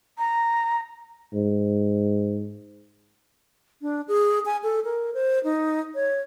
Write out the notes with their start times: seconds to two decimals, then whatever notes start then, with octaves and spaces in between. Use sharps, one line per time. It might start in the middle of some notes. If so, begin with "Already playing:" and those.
0.18 A#5
1.34 G#2
3.82 D4
4.08 G#4
4.46 G#5
4.63 A4
4.84 A#4
5.14 C5
5.44 D#4
5.95 C#5